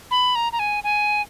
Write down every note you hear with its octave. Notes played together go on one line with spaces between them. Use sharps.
B5
A#5
A#5
G#5
G#5